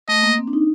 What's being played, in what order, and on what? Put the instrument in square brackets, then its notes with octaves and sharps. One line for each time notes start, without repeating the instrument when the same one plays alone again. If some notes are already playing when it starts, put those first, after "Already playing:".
[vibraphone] A3 [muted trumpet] D#5
[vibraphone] A#3
C4
D4
D#4